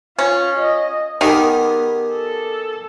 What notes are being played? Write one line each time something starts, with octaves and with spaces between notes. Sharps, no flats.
C#4 F4
D#5
D#3 B3 G4 G#4 A#4
A4